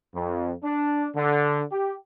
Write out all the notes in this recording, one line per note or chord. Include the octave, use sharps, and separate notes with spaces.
F2
D4
D3
G4